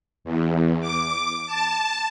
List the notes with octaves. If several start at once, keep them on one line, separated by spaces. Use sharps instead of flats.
E2
D6
A5